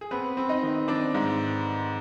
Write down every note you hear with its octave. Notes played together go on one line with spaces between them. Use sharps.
G#4
B3 C4 B4
C4
D#4 D#5
D#3
C4 D4 D5
G#2